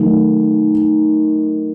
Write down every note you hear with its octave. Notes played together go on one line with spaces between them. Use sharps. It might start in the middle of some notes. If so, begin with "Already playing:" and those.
Already playing: D#3 F#3 A3